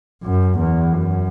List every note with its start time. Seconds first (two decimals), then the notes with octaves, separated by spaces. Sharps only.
0.23 F#2
0.58 E2
0.93 F#2